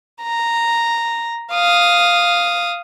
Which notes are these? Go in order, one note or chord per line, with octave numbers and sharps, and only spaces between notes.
A#5
F5 D#6